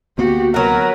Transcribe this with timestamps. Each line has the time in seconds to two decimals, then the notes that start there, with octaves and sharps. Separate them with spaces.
0.18 D2 A#3 B3 F#4 G4
0.54 F#3 F#4 A#4 B4